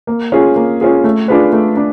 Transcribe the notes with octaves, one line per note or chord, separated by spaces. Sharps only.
A#3
C#4 F4 G#4
A#3
C#4 F4 G#4
A3
D4 F4 G#4 B4
A3
D4